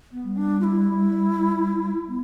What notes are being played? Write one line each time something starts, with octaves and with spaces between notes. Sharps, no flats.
B3
G3
D4
F4
E4
B3